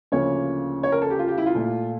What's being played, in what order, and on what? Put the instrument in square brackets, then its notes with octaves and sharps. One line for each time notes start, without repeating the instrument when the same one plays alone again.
[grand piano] D2 C#3 F3 A#3 C#5
C#5
A#4
A4
G4
F4
G4
E4
F4
A#2 A3